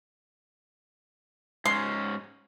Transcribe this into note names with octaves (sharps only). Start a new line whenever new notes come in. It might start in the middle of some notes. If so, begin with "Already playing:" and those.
G#2 G#3 C#4 C6